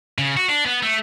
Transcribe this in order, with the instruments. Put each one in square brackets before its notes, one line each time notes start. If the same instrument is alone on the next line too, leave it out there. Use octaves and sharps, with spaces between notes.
[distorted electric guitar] C#3
F#4
D4
B3
A3